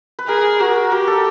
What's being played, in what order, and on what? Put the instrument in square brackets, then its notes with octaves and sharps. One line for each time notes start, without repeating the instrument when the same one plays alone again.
[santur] B4
[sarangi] G#4 [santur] A#4
[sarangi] F#4 [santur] A#4
[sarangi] G4 [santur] A#4
[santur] A4